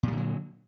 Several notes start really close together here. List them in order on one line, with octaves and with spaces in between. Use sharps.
A#2 G3 D3 F#3